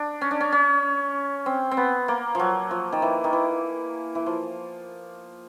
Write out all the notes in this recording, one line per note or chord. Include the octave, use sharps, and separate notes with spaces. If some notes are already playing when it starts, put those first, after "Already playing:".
Already playing: D4
C#4
D4
C#4
C#4
C4
C4
B3
A#3
F3 F#3
F3
D#3
E3
D#3
E3
E3
F3